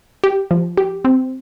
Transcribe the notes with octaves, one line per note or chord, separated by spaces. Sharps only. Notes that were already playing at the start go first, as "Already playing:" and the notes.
G4
F3
G4
C4